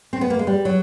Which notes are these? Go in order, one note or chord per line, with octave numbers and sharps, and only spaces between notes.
C4
B3
A#3
G#3
G3
F#3